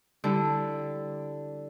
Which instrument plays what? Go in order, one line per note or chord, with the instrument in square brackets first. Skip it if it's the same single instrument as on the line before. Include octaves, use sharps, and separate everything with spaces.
[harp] D3 G3 E4